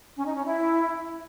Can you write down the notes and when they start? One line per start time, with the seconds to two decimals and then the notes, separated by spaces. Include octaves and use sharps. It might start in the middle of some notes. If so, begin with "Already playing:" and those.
0.16 C#4
0.25 D#4
0.35 C#4
0.45 E4